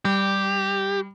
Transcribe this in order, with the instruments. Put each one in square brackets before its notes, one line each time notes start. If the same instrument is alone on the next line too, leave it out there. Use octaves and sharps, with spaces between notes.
[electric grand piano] G3 [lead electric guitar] G4